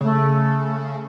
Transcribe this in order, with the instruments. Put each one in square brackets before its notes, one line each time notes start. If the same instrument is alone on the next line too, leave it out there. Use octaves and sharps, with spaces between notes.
[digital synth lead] C#3 [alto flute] A3